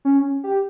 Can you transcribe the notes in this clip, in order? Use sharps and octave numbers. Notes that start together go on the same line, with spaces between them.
C#4
G4